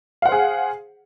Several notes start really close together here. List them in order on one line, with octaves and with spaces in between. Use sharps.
F5 F#5 C5 G#4